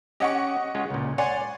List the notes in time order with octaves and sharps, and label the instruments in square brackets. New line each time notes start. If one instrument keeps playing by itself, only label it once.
[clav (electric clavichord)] C#4 G4 [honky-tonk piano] D#5 F#5 C#6
[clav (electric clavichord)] G#3 C#4 F4
C#2 A#2
[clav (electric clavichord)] C#5 [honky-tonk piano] D5 [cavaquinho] F#5 G#5 C6